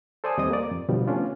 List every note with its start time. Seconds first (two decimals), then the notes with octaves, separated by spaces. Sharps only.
0.24 A4 C5 D5 G#5 D#6
0.38 D#2 G3 C4 D#5 D#6
0.51 A#3 D5
0.71 F2
0.89 B2 D3 F3 G3
1.08 A3 B3 C#4 D4 F4